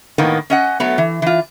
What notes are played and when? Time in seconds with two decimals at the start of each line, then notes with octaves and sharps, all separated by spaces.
0.18 A2 D#3 A#3 B3
0.50 C#4 D#5 F#5
0.80 F#3 A3 B3
0.98 E3
1.22 E3 F4